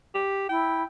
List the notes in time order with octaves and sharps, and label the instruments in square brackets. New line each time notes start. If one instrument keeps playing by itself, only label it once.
[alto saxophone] G4
[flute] E4 [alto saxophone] G5